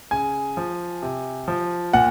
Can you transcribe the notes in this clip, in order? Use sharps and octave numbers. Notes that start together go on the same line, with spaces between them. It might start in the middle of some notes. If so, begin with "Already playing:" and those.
C#3 G#5
F3
C3
F3
A#2 F#5